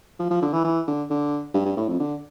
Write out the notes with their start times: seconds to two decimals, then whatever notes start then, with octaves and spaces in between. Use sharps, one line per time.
0.19 F3
0.31 F3
0.42 D3
0.53 E3
0.64 E3
0.87 D3
1.10 D3
1.54 G2
1.66 G2
1.77 A2
1.88 F2
2.00 D3